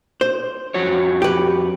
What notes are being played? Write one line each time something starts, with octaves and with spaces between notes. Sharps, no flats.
C5
F2 F#4 C#5
G4 B4